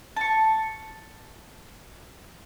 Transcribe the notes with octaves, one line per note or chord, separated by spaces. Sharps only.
A5 C#6